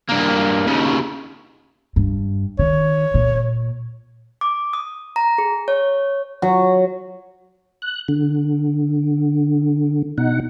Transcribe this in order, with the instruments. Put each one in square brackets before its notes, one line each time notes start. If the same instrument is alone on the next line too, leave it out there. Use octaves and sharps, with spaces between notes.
[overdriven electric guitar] G2 A#3
D#2 C#3
[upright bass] G2
[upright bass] D#3 [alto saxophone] C#5
[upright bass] A#2
[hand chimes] D6
D#6
A#5
G#4
C#5
[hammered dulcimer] F#3
[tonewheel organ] F#6
D3
B2 D#4 F#5